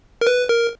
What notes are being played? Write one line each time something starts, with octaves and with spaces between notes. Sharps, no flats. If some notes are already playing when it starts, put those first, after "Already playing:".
A#4
B4
A#4